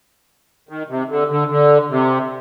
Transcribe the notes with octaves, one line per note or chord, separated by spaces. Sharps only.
D#3
C3
D3
D3
D3
C3